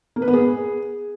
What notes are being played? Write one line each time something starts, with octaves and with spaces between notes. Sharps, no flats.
A#3
B4
B3
G#4